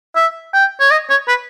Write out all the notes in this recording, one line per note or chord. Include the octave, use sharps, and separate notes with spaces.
E5
G5
C#5
D#5
C#5
B4